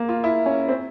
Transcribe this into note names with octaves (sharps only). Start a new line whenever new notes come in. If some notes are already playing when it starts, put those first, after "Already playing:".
Already playing: A#3
F4
E4
C#4
C4